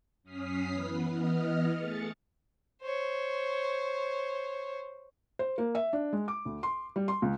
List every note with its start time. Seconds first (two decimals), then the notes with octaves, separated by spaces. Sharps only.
0.23 F#2 C#4 D#6 F6 B6 C7
0.71 E3 B3 B4
1.08 E3 B3 D#5 F6
1.73 A3 G#4 A6 C#7
2.82 C5 C#5
5.39 C5
5.58 A#3
5.75 E5
5.93 D4
6.13 G#3
6.28 D6
6.45 D2
6.63 C6
6.96 G3
7.08 C6
7.22 C#2